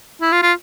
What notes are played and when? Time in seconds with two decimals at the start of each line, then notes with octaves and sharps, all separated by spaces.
0.21 E4
0.32 F4
0.43 F4